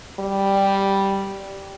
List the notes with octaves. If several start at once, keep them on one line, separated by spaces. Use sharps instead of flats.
G3